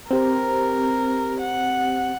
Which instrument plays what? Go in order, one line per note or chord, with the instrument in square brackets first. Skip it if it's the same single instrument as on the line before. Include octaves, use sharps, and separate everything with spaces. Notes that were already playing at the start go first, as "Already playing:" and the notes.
[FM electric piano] C4 G4 C5 [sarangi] A#4
[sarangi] F#5